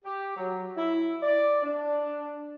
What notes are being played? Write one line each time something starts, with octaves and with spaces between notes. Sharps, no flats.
G4
F#3
E4
D5
D4